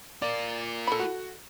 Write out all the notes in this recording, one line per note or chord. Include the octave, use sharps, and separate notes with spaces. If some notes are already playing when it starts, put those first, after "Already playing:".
F4 A#4 D5
A4 B5
F#4